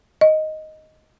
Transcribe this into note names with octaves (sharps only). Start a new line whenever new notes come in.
D#5